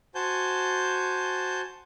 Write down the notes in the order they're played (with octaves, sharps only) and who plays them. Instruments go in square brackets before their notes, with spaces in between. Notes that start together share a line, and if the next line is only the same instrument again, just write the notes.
[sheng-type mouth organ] F#4 C5 G#5 A5 G6